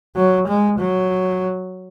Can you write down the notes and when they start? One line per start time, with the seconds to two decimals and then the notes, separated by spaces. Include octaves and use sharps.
0.17 F#3
0.48 G#3
0.79 F#3